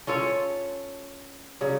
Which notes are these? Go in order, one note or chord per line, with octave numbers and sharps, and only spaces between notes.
C#4 F4 A4 C#5
C#3 F#3